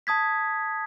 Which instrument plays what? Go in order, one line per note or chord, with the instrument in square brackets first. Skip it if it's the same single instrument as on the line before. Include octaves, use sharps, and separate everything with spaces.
[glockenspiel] A5 D#6 G#6 B6